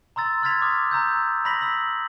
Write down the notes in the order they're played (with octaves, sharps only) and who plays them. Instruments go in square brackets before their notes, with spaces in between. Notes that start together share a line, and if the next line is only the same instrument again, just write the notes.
[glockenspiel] A#5 C6 E6 A6
C6 F6 G#6 A6 B6 F7
D6 D#6 F6
A#5 E6 G6
B5 A#6 B6 F#7
E6 B6 F#7